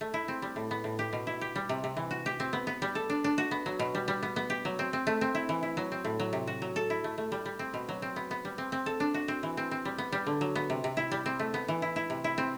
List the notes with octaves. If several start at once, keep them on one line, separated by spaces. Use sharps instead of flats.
A3
E4
C4
G3
A2
B3
A2
G4
B2
E4
G4
G3
C3
C3
E3
F#4
G4
C4
B3
B3
G3
A4
D4
D4
F#4
B3
F#3
B2
G3
G3
B3
B3
G4
F#3
C4
C4
A3
C4
E4
E3
E4
F#3
C4
A2
F#3
C3
F#4
F#3
A4
E4
A3
A3
G3
G3
C4
B2
F#3
C4
B3
B3
G3
C4
C4
A4
D4
F#4
C4
E3
C4
C4
G3
B3
G3
D3
F#3
B3
C3
C3
E4
G3
C4
A3
B3
E3
E4
E4
C3
E4
C4